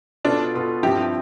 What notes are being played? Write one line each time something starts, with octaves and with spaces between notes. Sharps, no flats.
B2 B3 D4 F4 A4
B2 B3 F4 A4
G2 F3 C4 E4 G4